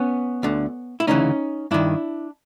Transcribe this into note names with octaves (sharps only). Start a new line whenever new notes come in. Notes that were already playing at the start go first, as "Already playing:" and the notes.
Already playing: B3 C#4
D2 D3
E4
D2 C#3 E3 C#4 D#4
G2 D#3 D4 E4